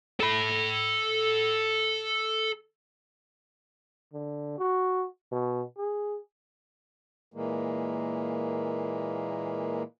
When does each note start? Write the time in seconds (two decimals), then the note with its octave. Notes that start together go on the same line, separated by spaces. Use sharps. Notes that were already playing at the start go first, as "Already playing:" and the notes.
0.20 A4 B5
4.13 D3
4.58 F#4
5.32 B2
5.78 G#4
7.34 A#2 E3 G#3 A#3